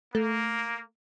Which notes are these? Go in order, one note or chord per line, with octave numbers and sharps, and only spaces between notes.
A3 A#3